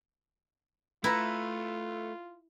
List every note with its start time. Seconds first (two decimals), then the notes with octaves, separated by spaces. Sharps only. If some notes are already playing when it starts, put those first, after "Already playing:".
1.04 A3 E4 F4 B4 E5 A#5